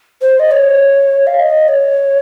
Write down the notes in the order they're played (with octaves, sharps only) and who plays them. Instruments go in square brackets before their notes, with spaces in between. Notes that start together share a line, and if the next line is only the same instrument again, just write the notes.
[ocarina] C5
D#5
C#5
F5
D#5
C#5